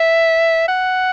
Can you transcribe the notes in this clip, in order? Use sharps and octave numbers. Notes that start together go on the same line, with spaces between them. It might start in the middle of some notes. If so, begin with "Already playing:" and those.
Already playing: E5
F#5